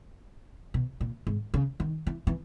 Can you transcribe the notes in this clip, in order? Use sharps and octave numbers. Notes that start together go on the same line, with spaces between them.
B2
A#2
G#2
C#3
D#3
E3
E3